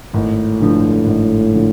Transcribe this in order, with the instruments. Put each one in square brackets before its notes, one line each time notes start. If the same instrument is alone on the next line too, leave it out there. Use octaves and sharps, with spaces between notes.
[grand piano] G#1 [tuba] A2
[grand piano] G2 D3 F3
G#1
D3 F3